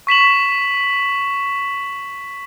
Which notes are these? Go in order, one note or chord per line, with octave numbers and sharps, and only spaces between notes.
C#6 B6 E7 F#7